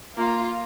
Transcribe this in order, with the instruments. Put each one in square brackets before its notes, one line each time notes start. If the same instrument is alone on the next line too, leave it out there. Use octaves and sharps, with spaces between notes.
[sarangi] A#3 [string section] F4